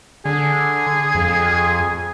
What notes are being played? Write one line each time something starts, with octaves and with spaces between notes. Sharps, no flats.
D3 G#4
F2